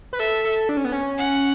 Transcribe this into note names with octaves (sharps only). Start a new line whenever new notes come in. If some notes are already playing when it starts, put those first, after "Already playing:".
B4
A4 E5
A4
D4
C#4
B3
C#4
F#5